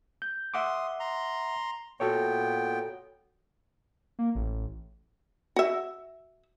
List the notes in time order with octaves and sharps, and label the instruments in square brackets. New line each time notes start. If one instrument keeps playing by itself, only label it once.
[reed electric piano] G6
[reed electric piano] E5 F#5 D6 [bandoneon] C6 D#6
[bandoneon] A#5 C6
[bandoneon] A#2 B3 G5 [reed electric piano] F#4 A4 C#5
[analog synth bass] A#3
A1
[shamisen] F#4 E5